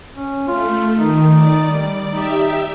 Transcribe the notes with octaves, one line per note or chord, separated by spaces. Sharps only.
C#4
A3 F4
D#3 D#4
D5
G3
D#4 G4 E5